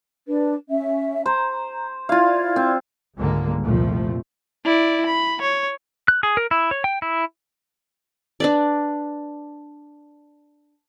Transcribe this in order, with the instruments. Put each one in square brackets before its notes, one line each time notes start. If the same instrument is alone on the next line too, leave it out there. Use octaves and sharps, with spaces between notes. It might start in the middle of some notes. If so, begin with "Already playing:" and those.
[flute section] D4 B4
C#4 E5
[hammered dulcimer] C5 [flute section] A#5
[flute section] E4 D5 G#6 [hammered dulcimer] F4 F5
[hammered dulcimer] C4
[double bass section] C#2 G#2 D3 G3 G#3 A#3
C2 F2 A#2 F3 A3
[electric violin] E4 D5
B5
C#5
[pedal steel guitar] F#6
G#4
A#4
E4
C#5
G5
E4
[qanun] D4 B4 D5